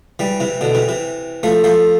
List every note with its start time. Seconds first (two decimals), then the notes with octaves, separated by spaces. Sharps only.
0.19 E3 G3
0.40 C3 E3
0.61 B2 D3
0.75 C3 E3
0.88 C3 E3
1.43 F3 A3
1.64 F3 A3